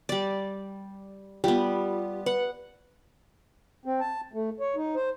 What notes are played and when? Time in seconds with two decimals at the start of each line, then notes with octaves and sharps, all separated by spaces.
0.09 G3 D5
1.44 G3 B3 F4 G4
2.26 B4 F#5
3.86 C4
4.00 A5
4.34 A3
4.60 C#5
4.76 D#4
4.96 C5